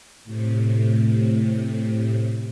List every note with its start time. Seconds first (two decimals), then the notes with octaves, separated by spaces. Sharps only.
0.24 A2 C3